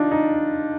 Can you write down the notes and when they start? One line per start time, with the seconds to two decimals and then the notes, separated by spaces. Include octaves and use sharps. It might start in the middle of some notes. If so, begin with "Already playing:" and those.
Already playing: D4 D#4 F4
0.12 D#4